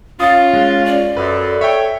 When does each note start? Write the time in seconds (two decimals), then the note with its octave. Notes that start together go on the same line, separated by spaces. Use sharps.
0.20 C#4 F4 F5 D#6 A6
0.53 G#3
0.86 D5
1.17 F#2 A4 B4
1.61 C#5 E5 G5